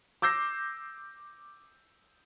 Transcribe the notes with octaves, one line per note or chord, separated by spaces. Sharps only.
D6 E6 G6 A#6 C7